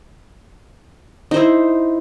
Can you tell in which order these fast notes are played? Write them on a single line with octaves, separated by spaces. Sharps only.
D#4 C5 E4